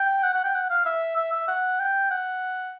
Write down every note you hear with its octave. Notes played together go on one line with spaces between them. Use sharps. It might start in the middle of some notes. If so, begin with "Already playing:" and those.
Already playing: G5
F#5
F#5
G5
F#5
F5
E5
E5
E5
F#5
G5
F#5